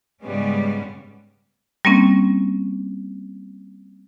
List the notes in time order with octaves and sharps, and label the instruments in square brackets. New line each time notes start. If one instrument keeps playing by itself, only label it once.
[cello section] G#2 C#3 G3 G#3 B3 C#4
[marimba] G3 A#3 C4 C#4